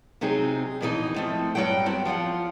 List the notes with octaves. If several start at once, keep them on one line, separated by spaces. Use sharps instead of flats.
C3 F#3 C4 D#4 G#4
F2 B2 E3 G#3 D#4 D#5
F3 A3 C4
G2 D#3 F#3 F#5 G5
B3 C4 F#4
F3 F4 C#5 F#5